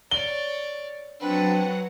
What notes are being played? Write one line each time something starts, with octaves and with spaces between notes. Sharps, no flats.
C#5 D5 G7
F#3 C4 D4 B4 F#5